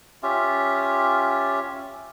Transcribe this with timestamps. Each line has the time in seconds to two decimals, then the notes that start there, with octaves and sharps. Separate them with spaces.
0.23 C#4 F4 G4 E5